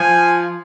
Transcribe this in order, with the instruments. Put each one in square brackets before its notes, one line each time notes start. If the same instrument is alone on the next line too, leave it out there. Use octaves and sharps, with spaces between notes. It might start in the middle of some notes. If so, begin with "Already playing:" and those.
Already playing: [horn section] F3 [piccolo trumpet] G#5